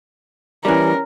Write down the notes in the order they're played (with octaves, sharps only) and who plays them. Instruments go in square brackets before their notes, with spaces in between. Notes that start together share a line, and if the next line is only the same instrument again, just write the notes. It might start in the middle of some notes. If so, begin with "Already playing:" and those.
[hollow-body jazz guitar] E3 G3 [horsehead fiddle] C#4 A#4